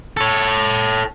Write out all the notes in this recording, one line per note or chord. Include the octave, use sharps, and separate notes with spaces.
A4 C#5